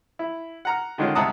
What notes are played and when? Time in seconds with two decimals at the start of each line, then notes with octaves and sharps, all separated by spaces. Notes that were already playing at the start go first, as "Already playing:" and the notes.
0.19 E4
0.65 F#5 A#5 F6
0.98 D3 D#3 G#3 C#4 F4
1.15 C2 G#3 F#5 A5 A#5 D#6